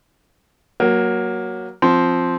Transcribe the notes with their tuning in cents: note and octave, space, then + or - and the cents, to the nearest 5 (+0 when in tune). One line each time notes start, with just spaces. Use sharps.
F#3 +0 A#3 +15
F3 +0 C4 +0